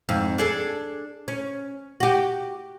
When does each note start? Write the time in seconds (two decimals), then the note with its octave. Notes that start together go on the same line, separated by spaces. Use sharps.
0.09 F2 G#2
0.38 D4 G#4 A4
1.28 C#4
2.00 F#4 G4